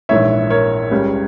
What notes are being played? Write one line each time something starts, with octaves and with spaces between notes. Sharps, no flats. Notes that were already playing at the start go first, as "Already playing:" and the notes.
A#1 G#2 E3 C#5 E5
A#4 C#5
C#2 C#3 G3 C#4